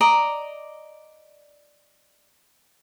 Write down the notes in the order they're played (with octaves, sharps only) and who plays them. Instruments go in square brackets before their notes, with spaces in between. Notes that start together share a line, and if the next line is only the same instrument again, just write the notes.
[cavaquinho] D5 D#5 A#5